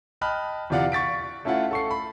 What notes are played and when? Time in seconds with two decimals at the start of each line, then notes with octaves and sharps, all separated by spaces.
0.21 D#5 G5 A5 B5 F6 F#6
0.70 E2 C3 F4 D5 F5 F#5
0.92 C#6 A6 B6 D7
1.45 A3 C#4 E4 F4 F#5
1.71 A4 C#6 C7
1.91 B5